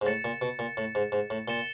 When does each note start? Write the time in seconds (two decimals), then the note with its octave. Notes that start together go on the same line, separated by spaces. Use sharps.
0.01 G#2
0.06 A2 A6 C#7 E7
0.24 A#2
0.41 B2
0.59 A#2
0.77 A2
0.95 G#2
1.12 G#2
1.30 A2
1.48 A#2 A6 C#7 E7 G7